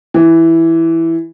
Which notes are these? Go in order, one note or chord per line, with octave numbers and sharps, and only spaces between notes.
E3